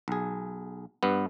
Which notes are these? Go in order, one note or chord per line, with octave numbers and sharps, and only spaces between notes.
B1 G#4
G2 B3